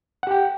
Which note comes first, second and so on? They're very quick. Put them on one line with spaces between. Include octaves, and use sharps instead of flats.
F#5 G4 G5